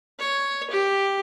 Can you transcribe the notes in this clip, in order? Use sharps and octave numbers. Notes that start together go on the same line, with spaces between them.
C#5
G4